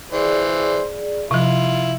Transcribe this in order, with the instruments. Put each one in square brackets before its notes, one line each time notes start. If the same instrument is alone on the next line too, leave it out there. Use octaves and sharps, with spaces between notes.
[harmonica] E3 C5 [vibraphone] G#4 D5
[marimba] C3 F3 [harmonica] E4 F4